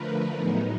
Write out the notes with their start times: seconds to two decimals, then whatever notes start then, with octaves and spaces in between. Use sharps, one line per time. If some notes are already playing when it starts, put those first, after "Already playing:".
Already playing: D3 F3 A3 A#4 B4
0.36 A2 F#3 B3 D#4 G#4